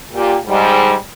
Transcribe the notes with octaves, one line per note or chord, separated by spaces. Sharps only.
A#2 G4
G#2 G3